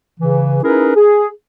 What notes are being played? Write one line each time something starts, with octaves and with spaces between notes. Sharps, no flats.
C#3 E3
C#4 D#4 E4 G#4 A#4 B4
G#4